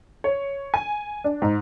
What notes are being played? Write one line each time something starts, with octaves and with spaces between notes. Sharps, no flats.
C#5
G#5
D4
G#2